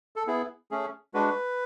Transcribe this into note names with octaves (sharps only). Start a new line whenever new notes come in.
A4
B3 E4 G#4
A3 C#4 G#4
G#3 D4 F#4 B4